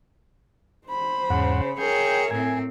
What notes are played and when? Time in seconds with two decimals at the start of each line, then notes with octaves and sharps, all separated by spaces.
0.87 C5 B5
1.30 E2 G#2 C#3 F#5
1.78 G#4 A#4 C#5 E5 G5
2.31 A2 C4 G#5